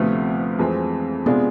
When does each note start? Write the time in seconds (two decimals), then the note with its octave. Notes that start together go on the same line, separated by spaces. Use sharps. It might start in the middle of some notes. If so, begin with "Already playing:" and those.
Already playing: D2 C3 F3 A3 B3 F4
0.59 F2 E3 G#3 C4
1.26 C3 G#3 B3 D4 F4